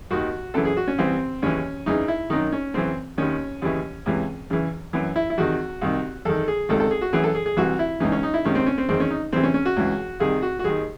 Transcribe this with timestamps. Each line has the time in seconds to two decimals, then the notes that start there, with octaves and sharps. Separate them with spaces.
0.11 D#2 D#3 F#4
0.54 F#2 C#3 E3 A4
0.65 G#4
0.77 F#4
0.88 C#4
0.98 C2 C3 E3 C4
1.42 D#2 C#3 E3 C#4
1.86 E2 C#3 E3 D#4
2.08 E4
2.30 F#2 D#3 D#4
2.52 C#4
2.74 F#2 C#3 E3 C4
3.18 D#2 D#3 C#4
3.62 D#2 C#3 E3
4.06 C#2 C3 E3
4.50 E2 C#3 E3
4.93 F#2 E3
5.16 E4
5.30 E4
5.37 E2 C3 D#3 F#4
5.81 C2 C3 D#3
6.25 E2 D#3 A4
6.48 G#4
6.69 C#2 C3 D#3 A4
6.80 A4
6.91 G#4
7.01 F#4
7.13 F#2 E3 G#4
7.23 A4
7.35 G#4
7.46 G#4
7.57 C2 C3 E3 F#4
7.79 E4
8.00 C#2 C#3 E3 D#4
8.12 C#4
8.23 D#4
8.34 E4
8.45 C#2 C3 D#3 C#4
8.55 C4
8.66 C#4
8.78 C4
8.89 E2 D#3 C4
9.00 C#4
9.10 D#4
9.32 E2 C3 E3 C4
9.43 C#4
9.54 C#4
9.65 F#4
9.76 C#2 C#3 E3
10.20 C2 C3 D#3 G#4
10.42 F#4
10.59 F#4
10.64 D#2 D#3 G#4